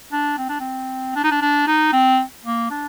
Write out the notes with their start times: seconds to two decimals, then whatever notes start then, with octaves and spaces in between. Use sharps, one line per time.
0.12 D4
0.38 C4
0.49 D4
0.60 C4
1.16 D4
1.24 D#4
1.31 D4
1.42 D4
1.67 D#4
1.93 C4
2.45 A#3
2.71 D4